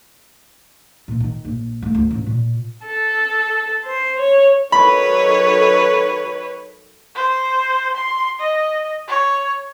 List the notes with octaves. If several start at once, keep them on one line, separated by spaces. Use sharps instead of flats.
A#2
D#3
A#1
A3
D2
A1
A#2
A4
C5
C#5
D#3 F#3 A4 B4 C#5 B5
C5
C6
D#5
C#5